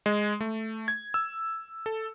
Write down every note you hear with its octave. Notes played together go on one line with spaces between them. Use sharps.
G#3
A3
G#6
E6
A4